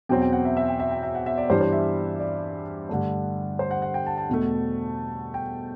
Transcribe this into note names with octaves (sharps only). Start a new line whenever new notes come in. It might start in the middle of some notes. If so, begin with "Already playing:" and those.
E2 B2 F#3 C4 G5
G5
F#5
E5
E5
G5
E5
G5
E5
F#5
E5
D5
G2 E3 G3 D4 C5
C5
E5
D5
G2 D3 A3 D4
C5
F#5
F#5
G5
A5
A5
E2 B2 A3
G5